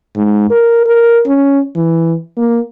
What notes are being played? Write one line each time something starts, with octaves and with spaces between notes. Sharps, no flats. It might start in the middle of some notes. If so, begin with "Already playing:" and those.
G#2
A#4
A#4
C#4
E3
A#3